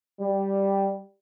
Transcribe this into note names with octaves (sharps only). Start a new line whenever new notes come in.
G3